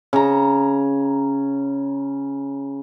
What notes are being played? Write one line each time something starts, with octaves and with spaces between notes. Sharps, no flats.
C#3 A#5